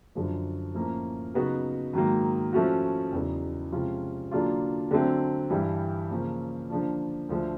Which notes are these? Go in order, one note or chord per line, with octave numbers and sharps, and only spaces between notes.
F#2 D3 F3
A2 F3 A#3 C#4
C#3 F#3 B3 D#4 F#4
G#2 D#3 F#3 A#3
F3 A3 C#4 F#4
E2 C#3 F#3 B3 D#4
C3 F3 G#3 C#4 F4
D3 F#3 A#3 D4 F4
D3 F#3 A3 C4
G2 E3 G3
C#3 F3 A#3 C#4
D3 F3 A#3 D4
D2 D3 F3